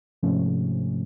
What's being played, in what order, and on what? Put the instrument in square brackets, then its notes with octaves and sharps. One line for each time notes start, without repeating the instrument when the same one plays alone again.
[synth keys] G#2 C3 F3 A3 C#4